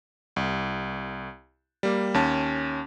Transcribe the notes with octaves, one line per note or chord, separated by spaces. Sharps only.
C2
G3 A#3
D#2 C#4 A5